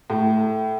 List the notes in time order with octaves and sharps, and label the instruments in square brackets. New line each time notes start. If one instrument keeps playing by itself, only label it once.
[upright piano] A2